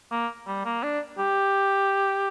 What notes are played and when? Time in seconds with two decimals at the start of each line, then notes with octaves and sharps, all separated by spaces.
0.11 A#3
0.47 G3
0.65 A#3
0.83 D4
1.19 G4